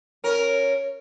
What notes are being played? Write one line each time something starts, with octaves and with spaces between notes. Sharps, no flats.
C#4 A#4